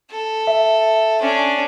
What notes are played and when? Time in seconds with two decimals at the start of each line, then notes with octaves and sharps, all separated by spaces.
0.11 A4
0.47 E5
1.21 C#4 D4